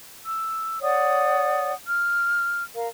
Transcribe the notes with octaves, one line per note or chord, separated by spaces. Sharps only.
E6
C#5 D5 F#5 D#6
F6
A#4 F5